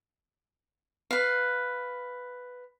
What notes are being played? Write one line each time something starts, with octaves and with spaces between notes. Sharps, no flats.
B4 F5